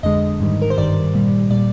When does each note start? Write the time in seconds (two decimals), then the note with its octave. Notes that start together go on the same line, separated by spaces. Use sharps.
0.03 F2 D3 G#3 D#5
0.40 G#2 D#3 G3
0.62 A#4
0.70 C5
0.77 G2 D#3 G3 D5
1.14 A#2 G3
1.50 A#2 G3 D5